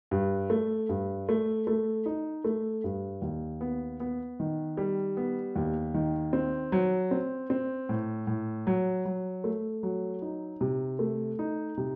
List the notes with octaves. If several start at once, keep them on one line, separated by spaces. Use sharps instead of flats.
G2
A3
G2
A3
A3
D#4
A3
G2
D#2
B3
B3
D#3
G3
B3
D#2
D#3
C4
F#3
C4
C4
A2
A2
F#3
F#3
A3
F#3
D#4
C3
A3
D#4
C3